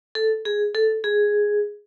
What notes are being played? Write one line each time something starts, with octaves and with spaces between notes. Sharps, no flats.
A4
G#4
A4
G#4